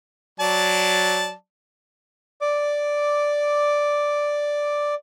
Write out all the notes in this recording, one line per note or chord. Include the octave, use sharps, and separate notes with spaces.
F#3 D5 A5
D5 D6